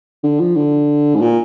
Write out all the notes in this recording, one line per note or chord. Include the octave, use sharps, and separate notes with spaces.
D3
F3
D3
G#2
A#2